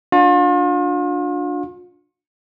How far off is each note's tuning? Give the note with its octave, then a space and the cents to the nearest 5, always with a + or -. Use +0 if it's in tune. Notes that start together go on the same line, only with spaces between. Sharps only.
D4 +0 F4 +40